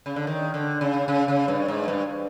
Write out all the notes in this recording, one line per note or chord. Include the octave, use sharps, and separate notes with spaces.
C#3
D3
D#3
D3
C#3
C#3
C#3
G2
G#2
G2